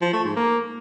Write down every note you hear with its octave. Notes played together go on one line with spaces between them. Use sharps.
F3
A3
G#2
A#3